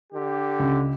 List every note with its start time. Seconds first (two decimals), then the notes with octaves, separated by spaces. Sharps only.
0.12 D3 G4
0.59 C#2